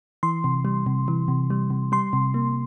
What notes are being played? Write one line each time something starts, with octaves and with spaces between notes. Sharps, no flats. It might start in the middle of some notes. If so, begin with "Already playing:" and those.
E3 C6
C3
G3
C3
E3
C3
G3
C3
G3 C6
C3
A#3